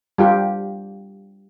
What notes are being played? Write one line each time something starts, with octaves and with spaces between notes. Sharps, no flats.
G3 F4 G4